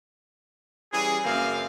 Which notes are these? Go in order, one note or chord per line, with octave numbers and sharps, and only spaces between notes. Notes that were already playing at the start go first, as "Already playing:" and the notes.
E3 G3 C#4 G#4
F#2 C#3 E3 A#3 C4 F5